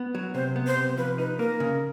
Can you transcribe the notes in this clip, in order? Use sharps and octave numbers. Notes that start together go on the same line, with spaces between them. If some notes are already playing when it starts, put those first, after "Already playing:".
Already playing: B3
F#3
C3 C5
B3
C5
C3
F3 B4
D#4 B4
A#3 A#4
C#3